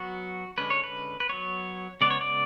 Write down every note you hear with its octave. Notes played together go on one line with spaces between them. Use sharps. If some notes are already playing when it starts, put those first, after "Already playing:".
Already playing: F#3 B3 F#4
D3 G#3 C#4 B4
C#5
B4
B4
F#3 B3 C#5
C#3 G#3 B3 D5
C#5
D5